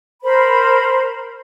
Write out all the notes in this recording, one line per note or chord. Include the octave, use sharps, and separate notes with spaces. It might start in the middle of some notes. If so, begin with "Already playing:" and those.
A#4 C5 B5